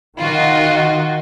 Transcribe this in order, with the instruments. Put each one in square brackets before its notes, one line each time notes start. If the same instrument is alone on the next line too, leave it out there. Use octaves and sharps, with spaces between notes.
[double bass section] D#3 [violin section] F4 F#4 D#5